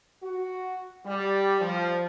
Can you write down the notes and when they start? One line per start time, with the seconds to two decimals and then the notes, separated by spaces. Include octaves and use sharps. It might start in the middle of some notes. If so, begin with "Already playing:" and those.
0.23 F#4
1.06 G3
1.61 F3